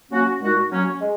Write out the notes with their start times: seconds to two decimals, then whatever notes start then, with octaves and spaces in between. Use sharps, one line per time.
0.11 F#3 A#3 C#4 F#4
0.40 A#2 G#3 D#4 F#4 A#4
0.71 F#3 A#3 C#4
1.01 G#3